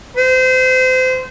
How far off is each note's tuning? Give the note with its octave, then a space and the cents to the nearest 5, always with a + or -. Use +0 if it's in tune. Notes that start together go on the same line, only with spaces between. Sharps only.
C5 -30